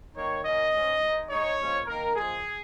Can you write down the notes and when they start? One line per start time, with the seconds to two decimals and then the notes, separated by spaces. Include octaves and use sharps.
0.16 D#3 A#3 D#4 C#5
0.44 A#2 A#3 C#4 D#5
0.73 G#2 G#3 C#4
1.01 G#2 G#3 D#4
1.30 G#2 G#3 D#4 C#5
1.59 A#2 F3 G#3 C#4
1.86 D#3 A#3 D#4 A#4
2.15 A#2 F3 G#3 G#4